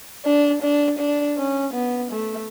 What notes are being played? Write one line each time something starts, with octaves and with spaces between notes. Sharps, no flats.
D4
D4
D4
C#4
B3
A3